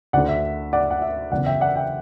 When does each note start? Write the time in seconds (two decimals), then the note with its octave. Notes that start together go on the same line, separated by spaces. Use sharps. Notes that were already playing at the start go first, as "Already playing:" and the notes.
0.13 D2 D5 F#5
0.17 D3
0.29 E5
0.73 D5 F#5
0.91 F#5
1.02 E5
1.31 F#1 E2 C#3 E3 D5 F#5
1.46 E5 G5
1.61 D5 F#5
1.76 E5 G5